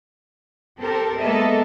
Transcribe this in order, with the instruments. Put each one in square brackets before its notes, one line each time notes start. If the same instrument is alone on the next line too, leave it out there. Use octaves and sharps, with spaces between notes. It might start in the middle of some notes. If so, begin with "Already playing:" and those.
[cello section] C4 G4 A4 A#4
G#3 A#3 B3 A4 D#5 E5